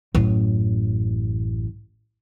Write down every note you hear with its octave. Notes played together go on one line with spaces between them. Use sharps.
A1 F#2